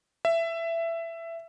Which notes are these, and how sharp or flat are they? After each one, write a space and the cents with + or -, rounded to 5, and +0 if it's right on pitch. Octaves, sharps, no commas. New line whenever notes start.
E5 +15